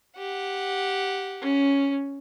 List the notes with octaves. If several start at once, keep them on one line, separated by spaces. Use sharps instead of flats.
G4 F#5
C#4